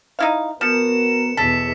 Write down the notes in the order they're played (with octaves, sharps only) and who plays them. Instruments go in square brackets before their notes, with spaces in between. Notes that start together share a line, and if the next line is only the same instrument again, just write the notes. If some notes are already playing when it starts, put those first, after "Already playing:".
[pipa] D#4 E4 F5
[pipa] F3 [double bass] B3 [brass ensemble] F#4 A#4 [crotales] C#7 E7
[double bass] E2 B2 [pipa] A4 [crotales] B6